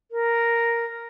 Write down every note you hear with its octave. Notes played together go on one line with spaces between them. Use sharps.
A#4